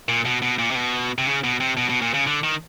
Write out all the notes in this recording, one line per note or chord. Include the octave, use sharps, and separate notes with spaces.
A#2
B2
B2
A#2
C3
B2
C3
C#3
B2
C3
B2
B2
A#2
C#3
D3
D#3